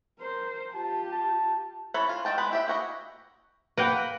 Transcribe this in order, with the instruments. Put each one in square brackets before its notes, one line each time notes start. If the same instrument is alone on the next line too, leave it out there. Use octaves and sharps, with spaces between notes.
[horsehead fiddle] A#4 C5
[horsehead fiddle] F4 G4 [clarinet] A5
[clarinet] A5
[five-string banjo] E3 C#4 A4 B5
F4
D#3 D#5 G5 A5
G#3 B3 B4 B5
E4 G4 E5
A#3 E4 F#4 D#5
[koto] A#3 A#4 G5 [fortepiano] B4 F#5